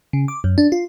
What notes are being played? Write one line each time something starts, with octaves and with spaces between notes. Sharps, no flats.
C#3
D6
F#2
D4
F4